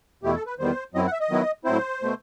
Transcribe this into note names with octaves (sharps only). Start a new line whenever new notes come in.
E2 B2 A3 E4 G4
A4
B4
E2 D#3 G3 B3 C5
F#2 F#3 C4 E4 D#5
F#5
E5
D#5
D#3 F#3 B3 E4
A2 F#3 C4 E4 C5
B2 A3